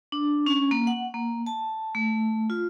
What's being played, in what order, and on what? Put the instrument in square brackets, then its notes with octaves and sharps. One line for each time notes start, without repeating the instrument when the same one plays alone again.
[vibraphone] D4
C#4
A#3
F#5
A#3
A5
A3
F4